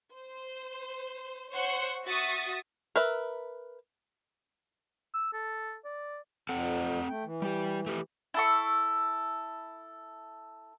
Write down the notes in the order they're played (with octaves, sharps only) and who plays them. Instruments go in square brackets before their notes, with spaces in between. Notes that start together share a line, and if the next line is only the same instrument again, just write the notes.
[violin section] C5
C5 C#5 F#5 C6 C#6
F#4 E5 C#6 D#6 A6 B6
[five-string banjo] A#4 B4 E5
[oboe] E6
A4
D5
[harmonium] F2 [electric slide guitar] C4 A4 F#5
[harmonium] A3 G5
E3
[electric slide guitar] G3 G4
A3 G4
[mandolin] E4 A4 C#6